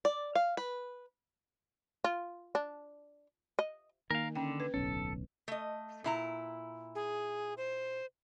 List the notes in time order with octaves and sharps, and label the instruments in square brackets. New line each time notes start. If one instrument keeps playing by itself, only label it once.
[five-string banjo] D5
F5
B4
[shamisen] F4
D4
D#5
[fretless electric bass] D#3 [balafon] A#3 [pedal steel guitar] A#4 F5
[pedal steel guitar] D3 [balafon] C#4 G5
[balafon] B4
[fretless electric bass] D1 B1 C#4 [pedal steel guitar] A4
[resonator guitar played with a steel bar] A3 D#5
A#2 E4 A#5
[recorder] G#4
C5